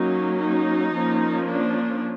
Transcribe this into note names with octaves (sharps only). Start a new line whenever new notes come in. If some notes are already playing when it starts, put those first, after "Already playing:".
Already playing: F#3 A#3 C#4 D#4
D#4
F3 A#3 C#4
D4